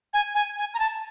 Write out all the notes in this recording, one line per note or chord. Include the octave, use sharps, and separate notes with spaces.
G#5
G#5
G#5
A#5
A5